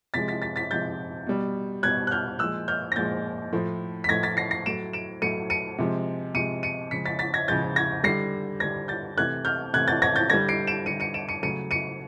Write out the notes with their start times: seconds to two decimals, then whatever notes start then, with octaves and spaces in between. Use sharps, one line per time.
0.14 C3 F3 G#3 A6 B6
0.28 A6 B6
0.42 A6 B6
0.56 A6 B6
0.71 C3 F3 G#3 G6 A6
1.26 B2 G3
1.83 B2 G3 F#6 G#6
2.07 F#6
2.11 F6 G6
2.39 A#2 F3 G#3 E6 F#6
2.68 F6 G6
2.92 A#6
2.96 A#2 F3 G#3 G6 A6
3.53 A2 F3 A3
4.04 B6
4.09 A2 F3 A3 G#6 A#6
4.23 A6 B6
4.37 A#6 C7
4.51 A#6 C7
4.66 A2 F#3 A3 D7 E7
4.93 D7 E7
5.22 A2 F#3 A3 C#7 D#7
5.50 C#7 D#7
5.78 C3 F3 G#3
6.34 C3 F3 G#3 C#7 D#7
6.63 C#7 D#7
6.91 C#3 F3 G#3 B6 C#7
7.06 A6 B6
7.19 A6 B6
7.34 G#6 A#6
7.48 C#3 F3 G#3 G6 A6
7.76 G#6 A#6
8.04 D3 G3 A#6 C7
8.60 D3 G3 G#6 A#6
8.88 G6 A6
9.17 C3 E3 A3 F#6 G#6
9.45 F6 G6
9.74 C3 E3 A3 F#6 G#6
9.88 G6 A6
10.02 G#6 A#6
10.16 G6 A6
10.30 D3 G3 G#6 A#6
10.49 C7 D7
10.67 D7 E7
10.86 D3 G3 C#7 D#7
11.00 C#7 D#7
11.14 D7 E7
11.29 C#7 D#7
11.43 C#3 F#3 A3 C#7 D#7
11.71 C#7 D#7